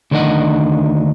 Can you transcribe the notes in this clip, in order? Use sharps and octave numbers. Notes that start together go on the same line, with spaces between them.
D2 D#3 D4 A4 D#5 F#5